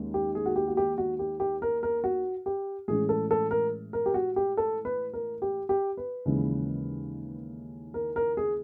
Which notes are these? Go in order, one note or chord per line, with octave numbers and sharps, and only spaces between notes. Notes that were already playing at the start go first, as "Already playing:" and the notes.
Already playing: D#2 D#3 G#3 C#4
G4
G#4
F#4
G4
F#4
G4
F#4
G4
G4
A#4
A#4
F#4
G4
A2 E3 G#3 C#4 G#4
A4
A4
A#4
A#4
G4
F#4
G4
A4
B4
A#4
G4
G4
B4
D#2 C#3 E3 G#3
A#4
A#4
G#4